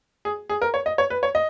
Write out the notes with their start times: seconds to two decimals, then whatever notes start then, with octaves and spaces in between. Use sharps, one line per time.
0.25 G#4
0.50 G#4
0.62 A#4
0.74 C#5
0.86 D#5
0.98 C#5
1.10 B4
1.23 C#5
1.35 D#5